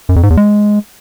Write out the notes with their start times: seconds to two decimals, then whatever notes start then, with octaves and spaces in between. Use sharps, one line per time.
0.09 F#2
0.16 F2
0.23 G#2
0.30 E2
0.37 G#3